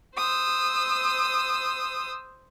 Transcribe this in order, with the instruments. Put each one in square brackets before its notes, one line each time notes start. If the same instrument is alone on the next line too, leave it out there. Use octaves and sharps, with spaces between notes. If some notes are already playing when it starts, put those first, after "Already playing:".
[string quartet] C5 D#6 E6